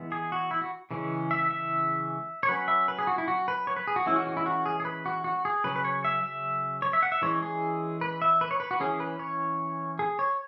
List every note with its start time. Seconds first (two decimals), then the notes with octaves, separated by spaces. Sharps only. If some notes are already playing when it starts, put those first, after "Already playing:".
Already playing: E3 G#3 B3
0.12 G#4
0.32 F#4
0.51 E4
0.62 F#4
0.91 C#3 E3 G#3 C#4
1.31 E5
1.51 E5
2.43 C#5
2.49 F#3 C#4 B4
2.68 E5
2.88 B4
2.99 G#4
3.07 F#4
3.18 E4
3.28 F#4
3.48 B4
3.67 C#5
3.76 B4
3.87 G#4
3.96 F#4
4.06 E3 G#3 C#4 E4
4.16 F#4
4.27 F#4
4.37 E4
4.46 F#4
4.66 G#4
4.80 G#4
4.85 B4
5.06 F#4
5.24 F#4
5.45 G#4
5.64 C#3 F#3 C#4 B4
5.76 B4
5.85 C#5
6.05 E5
6.23 E5
6.82 C#5
6.93 E5
7.03 F#5
7.12 E5
7.22 E3 G#3 C#4 C#5
7.43 G#4
8.01 B4
8.22 E5
8.41 B4
8.51 C#5
8.60 B4
8.71 F#4
8.80 E3 C#4 G#4
9.00 B4
9.19 C#5
9.99 G#4
10.19 C#5